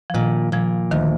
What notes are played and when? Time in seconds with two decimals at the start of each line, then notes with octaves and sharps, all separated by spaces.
0.10 F3
0.14 A#2 D#3
0.52 A#2 F3
0.91 D2 D#3